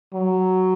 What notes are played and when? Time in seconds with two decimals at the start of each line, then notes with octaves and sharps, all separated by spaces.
0.13 F#3